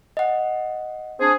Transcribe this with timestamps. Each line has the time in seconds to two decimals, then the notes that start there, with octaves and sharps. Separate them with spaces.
0.17 D#5 F#5
1.20 C4 D4 G#4